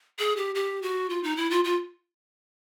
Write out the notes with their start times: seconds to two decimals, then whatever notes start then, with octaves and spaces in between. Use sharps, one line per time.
0.19 G#4
0.37 G4
0.55 G4
0.82 F#4
1.10 F4
1.23 D#4
1.37 E4
1.51 F4
1.64 F4